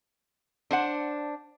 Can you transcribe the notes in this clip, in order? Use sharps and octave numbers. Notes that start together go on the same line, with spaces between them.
D4 C5 F#5